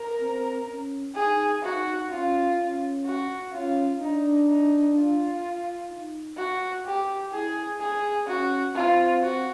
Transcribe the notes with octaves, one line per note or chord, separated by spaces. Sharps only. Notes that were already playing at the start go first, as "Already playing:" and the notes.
Already playing: A#4
C4
C#4
D#4 G#4
D#4 F#4
C#4 F4
C#4
F#4
C#4 F4
D4 D#4
D#4
F4
D#4
F#4
G4
E4 G#4
G#4
C#4 F#4
C4 F4
F#4